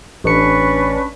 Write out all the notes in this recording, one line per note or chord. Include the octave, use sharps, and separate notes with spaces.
A1 C#4 D4 B4 C#6 C#7